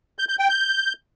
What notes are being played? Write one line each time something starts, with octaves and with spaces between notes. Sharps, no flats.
G6
G6
G5
G6